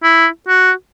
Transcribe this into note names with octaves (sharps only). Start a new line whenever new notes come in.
E4
F#4